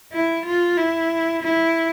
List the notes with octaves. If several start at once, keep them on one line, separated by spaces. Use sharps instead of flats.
E4
F4
E4
E4